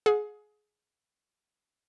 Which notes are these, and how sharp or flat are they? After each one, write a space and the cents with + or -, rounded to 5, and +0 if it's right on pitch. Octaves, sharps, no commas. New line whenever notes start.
G#4 +20 F#5 -40